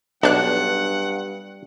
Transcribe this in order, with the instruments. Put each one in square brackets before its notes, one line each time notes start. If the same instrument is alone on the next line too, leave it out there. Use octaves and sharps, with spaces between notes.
[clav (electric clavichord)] B1 [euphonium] G2 [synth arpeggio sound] D4 F#6 [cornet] F#5